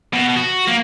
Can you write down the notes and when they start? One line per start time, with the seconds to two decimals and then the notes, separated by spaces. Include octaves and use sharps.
0.13 B2
0.37 F#4
0.68 A#3